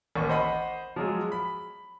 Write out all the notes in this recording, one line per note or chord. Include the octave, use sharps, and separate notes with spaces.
A1 D#2 C#6
C5 D#5 F#5 B5 C6
F3 F#3 G#3
B5